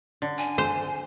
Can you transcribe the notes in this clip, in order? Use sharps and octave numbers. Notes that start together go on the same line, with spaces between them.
D3
G#5
C5